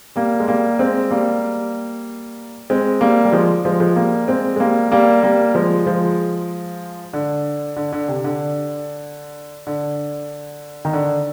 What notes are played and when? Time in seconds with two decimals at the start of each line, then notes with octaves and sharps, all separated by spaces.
0.16 G3 A#3
0.40 G#3
0.48 G3 A#3
0.79 G#3 C4
1.11 G3 A#3
2.70 G#3 C4
3.01 G3 A#3
3.25 G3
3.33 F3 G#3
3.65 F3 G#3
3.80 F3 G#3
3.96 G3 A#3
4.28 G#3 C4
4.56 G#3
4.60 G3 A#3
4.92 G3 A#3
5.23 G3 A#3
5.55 F3 G#3
5.87 F3 G#3
7.13 D3
7.77 D3
7.93 D3
8.08 C3
8.24 D3
9.67 D3
10.85 D#3
10.93 D3